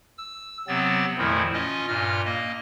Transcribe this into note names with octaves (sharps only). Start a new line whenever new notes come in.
E6
C3 F#3 B3 C4 A6
F2 A#2 D#3 F3 A3 E4
C#4 F4 D#5
G2 A#2 F4 F6
A#3 D#5